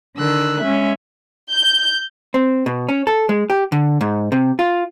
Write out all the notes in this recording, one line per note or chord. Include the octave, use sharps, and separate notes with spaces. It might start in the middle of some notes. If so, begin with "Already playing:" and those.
D3 D#3 E6 F#6
G#3 C#4 E5
G6
C4
B2
C#4
A4
G#3
G4
D3
G#2
C3
F4